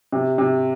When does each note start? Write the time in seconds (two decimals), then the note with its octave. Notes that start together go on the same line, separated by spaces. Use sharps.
0.12 C3
0.38 C3